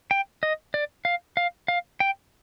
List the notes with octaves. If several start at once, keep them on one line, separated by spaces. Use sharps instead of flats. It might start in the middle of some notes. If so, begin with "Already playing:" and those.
G5
D#5
D5
F5
F5
F5
G5